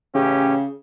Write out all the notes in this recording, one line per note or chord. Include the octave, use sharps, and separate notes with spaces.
A1 C#3 C#4 G4